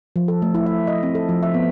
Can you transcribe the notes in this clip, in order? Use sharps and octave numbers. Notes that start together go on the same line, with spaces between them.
F3
A4
A3
E4
E5
D#5
C4
A4
F3
E5
B3